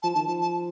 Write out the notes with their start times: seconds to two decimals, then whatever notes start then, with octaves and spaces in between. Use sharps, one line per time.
0.03 F3 A5
0.15 D#3 A5
0.28 F3 A5
0.41 A5